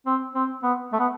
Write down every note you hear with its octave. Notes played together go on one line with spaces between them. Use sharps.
C4
C4
B3
A3
B3